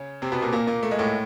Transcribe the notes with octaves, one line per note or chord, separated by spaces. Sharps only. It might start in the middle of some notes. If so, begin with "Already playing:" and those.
Already playing: C#3 C#4
C3 C4
B2 B3
A#2 A#3
A#2 A#3
A#2 A#3
A3
G#3
A2 A3